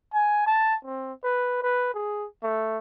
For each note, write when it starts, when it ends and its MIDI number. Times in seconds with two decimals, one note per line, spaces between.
0.14 0.42 80
0.46 0.76 81
0.85 1.13 60
1.24 1.63 71
1.63 1.91 71
1.94 2.26 68
2.43 2.78 57